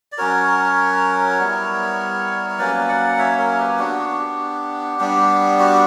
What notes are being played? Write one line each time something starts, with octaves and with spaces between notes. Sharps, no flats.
D5
F#3 C#4 F#4 A#4 C#5
G3 B3 E4
C#5
F#3 A#3 C#4 B4 D5
D5 F#5
C#5 E5
A#4 C#5
G4 B4
B3 D4 F#4 G4
F#4
G4
G3 B3 D4
F#4